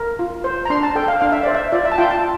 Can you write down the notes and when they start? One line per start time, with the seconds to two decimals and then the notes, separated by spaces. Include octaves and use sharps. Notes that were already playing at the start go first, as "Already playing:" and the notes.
Already playing: A#4
0.19 F4
0.44 C5
0.65 A#5
0.70 D4 C6
0.83 A5
0.95 A4 G5
1.08 F5
1.21 D4 F5
1.32 E5
1.43 C5 D5
1.55 E5
1.72 F4 D5
1.85 E5
1.92 A5
1.98 F4 G5
2.11 A5